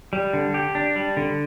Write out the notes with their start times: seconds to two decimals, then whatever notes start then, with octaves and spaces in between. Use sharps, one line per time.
0.13 G3
0.33 D3
0.54 G4
0.75 D4
0.96 G3
1.17 D3